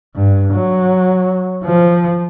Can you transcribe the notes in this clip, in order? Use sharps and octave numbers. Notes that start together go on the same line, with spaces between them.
G2
F#3
F3